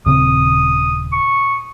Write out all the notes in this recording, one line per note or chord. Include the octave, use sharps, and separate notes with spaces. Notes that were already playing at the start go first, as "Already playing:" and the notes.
D#1 C#3 C4 D#6
C#6